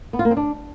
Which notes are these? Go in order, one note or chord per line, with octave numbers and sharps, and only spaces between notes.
B3
F4
A#3
C4
D4